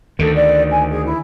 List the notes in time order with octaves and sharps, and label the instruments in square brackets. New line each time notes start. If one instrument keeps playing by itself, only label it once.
[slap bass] D2 D#3 [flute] A4
[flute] D5
G#5
G#4
E4